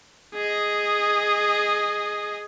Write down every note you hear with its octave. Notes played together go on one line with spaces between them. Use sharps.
G#4 D#5